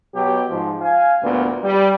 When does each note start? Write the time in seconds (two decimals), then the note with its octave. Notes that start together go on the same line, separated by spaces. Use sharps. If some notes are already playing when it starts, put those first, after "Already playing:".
0.15 B2 F#3 G4
0.50 G#2 F3
0.81 F5 G#5
1.22 G1 D2 A#2 B3
1.64 G3